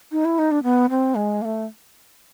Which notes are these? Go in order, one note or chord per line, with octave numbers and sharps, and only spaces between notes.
D#4
E4
D#4
D4
B3
C4
G#3
A#3
A3